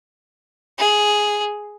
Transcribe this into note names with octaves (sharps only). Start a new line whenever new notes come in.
G#4